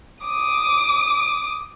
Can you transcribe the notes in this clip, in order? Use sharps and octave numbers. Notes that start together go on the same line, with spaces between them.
D6 D#6